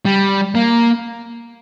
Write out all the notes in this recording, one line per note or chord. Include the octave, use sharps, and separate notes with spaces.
G3
A#3